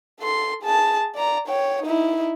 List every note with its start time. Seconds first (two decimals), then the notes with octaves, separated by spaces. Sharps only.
0.20 A4 C6
0.62 G#4 A5
1.15 D5 A#5
1.47 C#5 G5
1.83 D#4 E4